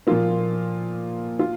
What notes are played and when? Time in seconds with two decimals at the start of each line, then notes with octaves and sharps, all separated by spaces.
0.07 A#2 F3 A#3 F4
1.39 F4